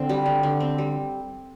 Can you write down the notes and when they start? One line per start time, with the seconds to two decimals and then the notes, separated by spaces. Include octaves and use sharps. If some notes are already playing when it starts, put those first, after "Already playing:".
Already playing: D3 C4
0.09 G3
0.26 D3
0.43 D3
0.60 C4
0.78 G3